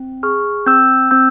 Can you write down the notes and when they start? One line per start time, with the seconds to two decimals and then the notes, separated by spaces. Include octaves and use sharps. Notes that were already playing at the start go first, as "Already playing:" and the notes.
Already playing: C4
0.23 G#4 C#6 F6
0.66 C4 E6 G6
1.11 C4 E6 G6